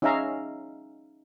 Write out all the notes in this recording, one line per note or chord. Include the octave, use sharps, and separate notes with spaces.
C#4 D#4 G#4 E5 F5 A#5